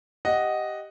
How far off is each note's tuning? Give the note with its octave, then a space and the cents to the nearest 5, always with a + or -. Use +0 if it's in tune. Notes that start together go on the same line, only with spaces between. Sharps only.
G4 +0 D#5 +0 F#5 +0